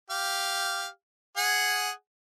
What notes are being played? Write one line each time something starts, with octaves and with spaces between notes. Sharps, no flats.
G4 F5
G#4 F#5 G#5